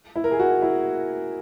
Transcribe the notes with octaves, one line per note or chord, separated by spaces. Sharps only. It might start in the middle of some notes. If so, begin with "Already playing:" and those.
E4
A#4
G#4
F#4
E4